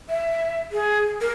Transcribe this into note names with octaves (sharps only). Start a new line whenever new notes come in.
E5
G#4
A#4